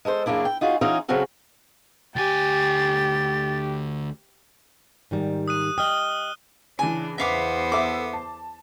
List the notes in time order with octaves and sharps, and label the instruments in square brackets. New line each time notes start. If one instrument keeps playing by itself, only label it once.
[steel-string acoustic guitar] G#3 A4 A#4 C5
F#2 C#3 A#3 D4 E4
G5
D#4 F4 F#4 G#4
E3 C#4 D#4 F4 F#4 G#4
C#3 F#3 C4 C#4 F#4 A4
[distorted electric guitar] D2 G#5 [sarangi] G4 [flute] A6
[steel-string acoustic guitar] G#2 D#3 G3
[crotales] D#6 F#6 D#7
[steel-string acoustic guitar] D#5 G5 [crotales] D#6 F6 G7
[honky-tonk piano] C#3 E3 [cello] D4 [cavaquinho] G#5
[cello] E2 C5 [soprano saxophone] B3 [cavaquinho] E5 F5 D6
[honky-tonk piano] A4 E5 [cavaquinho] D6
[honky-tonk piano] A5